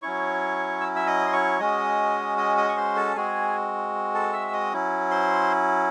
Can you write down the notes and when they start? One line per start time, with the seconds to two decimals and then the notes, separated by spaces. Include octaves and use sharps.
0.02 F#3 C#4 E4 C#5 C#6
0.81 E6
0.96 E5 E6
1.07 D#5 D#6
1.27 C6
1.33 C#5 C#6
1.59 G#3 C#4 F#4 D#5 D#6
2.38 D#5 D#6
2.57 D#5 D#6
2.69 C#6
2.77 C5 C6
2.96 A4 A5
3.16 G#3 C4 F#4 G#4 G#5
4.14 A4 A5
4.33 E5 E6
4.48 E6
4.53 D#5 D#6
4.73 F#3 C#4 E4
5.11 C5 C6